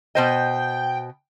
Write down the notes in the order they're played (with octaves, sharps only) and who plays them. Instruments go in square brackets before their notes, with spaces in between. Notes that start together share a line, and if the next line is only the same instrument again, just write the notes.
[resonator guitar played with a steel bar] B2 C5 D#5 [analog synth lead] G5